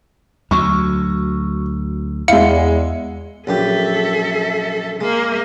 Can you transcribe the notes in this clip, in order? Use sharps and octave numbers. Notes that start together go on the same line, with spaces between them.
D2 F#3 C#6
E2 G#3 E4 F5 C#7
A#1 F#2 G4 A4 E5
G#3 A#3